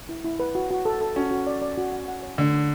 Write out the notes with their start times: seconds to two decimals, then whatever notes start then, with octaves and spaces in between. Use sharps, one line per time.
0.09 E4
0.25 E4
0.40 B4
0.55 F#4
0.71 F#4
0.85 A4
1.01 A4
1.16 C#4 F#4
1.31 F#4
1.47 D5
1.62 D5
1.78 F#4
1.93 F#5
2.08 F#5
2.23 C#5
2.38 D3 A3
2.53 D4